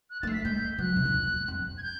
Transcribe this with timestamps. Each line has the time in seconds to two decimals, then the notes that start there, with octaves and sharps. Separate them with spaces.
0.10 F#6
0.22 A#3 A6
0.27 A3 C7
0.33 B6
0.45 G#3 G6
0.79 F#3 F#6
0.96 C3
1.05 A#2
1.14 E2
1.48 F2
1.78 G#6
1.83 G6